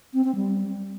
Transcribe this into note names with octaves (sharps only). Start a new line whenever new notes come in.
C4
C4
G3